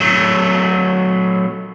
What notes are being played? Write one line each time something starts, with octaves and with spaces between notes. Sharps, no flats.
F#3 A3